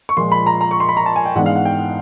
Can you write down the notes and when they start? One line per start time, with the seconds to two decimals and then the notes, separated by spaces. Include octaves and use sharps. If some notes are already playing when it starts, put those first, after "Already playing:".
0.09 C#6
0.17 A#2 F3 G#3 C6
0.32 B5
0.47 A#5
0.61 A#5
0.71 C#6
0.80 C6
0.89 B5
0.97 A#5
1.06 A5
1.16 G#5
1.25 G5
1.36 G#2 E3 G#3 B3 D4 F#5
1.46 F5
1.56 F#5
1.65 G5